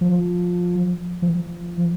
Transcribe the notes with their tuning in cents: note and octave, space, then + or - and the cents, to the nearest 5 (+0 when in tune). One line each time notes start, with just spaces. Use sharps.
F3 +15
F3 -15